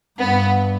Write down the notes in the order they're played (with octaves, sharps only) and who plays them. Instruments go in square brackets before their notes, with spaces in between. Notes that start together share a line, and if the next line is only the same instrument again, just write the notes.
[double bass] G2 [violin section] B3